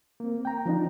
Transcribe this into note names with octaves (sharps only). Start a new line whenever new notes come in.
A#3 C4
G5 A#5
F3 C4 D4 D#4 F4